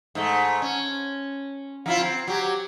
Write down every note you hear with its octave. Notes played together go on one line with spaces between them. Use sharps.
G#2 A3
C#4
F3 E4 F4
C4
F#3 G4